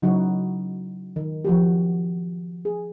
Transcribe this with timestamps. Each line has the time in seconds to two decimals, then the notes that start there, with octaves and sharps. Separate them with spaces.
0.02 C#3 F#3 D#4 E4 F#4
1.16 D#3
1.45 F3 F#4 G4
2.65 G#4